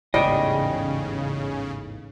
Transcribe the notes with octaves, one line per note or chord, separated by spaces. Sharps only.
A1 E2 G#2 C#3 G3 D#5 G5